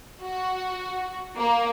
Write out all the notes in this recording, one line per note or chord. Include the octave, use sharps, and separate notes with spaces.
F#4
A#3